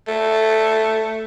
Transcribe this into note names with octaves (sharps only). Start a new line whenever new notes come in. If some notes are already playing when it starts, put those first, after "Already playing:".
A3